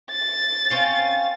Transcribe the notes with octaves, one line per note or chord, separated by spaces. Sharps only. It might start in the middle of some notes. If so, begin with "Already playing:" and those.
A6
C4 C#4 F5